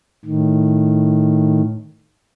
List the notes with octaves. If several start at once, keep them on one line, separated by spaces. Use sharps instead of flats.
A2 D#3